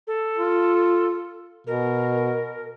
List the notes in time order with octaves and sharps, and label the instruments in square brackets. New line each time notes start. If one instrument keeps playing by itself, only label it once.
[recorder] A4
[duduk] F4
[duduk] B2 [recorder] A#4